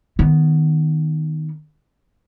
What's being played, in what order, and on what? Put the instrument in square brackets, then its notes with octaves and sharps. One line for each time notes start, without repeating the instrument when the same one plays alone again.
[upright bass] D#3 B3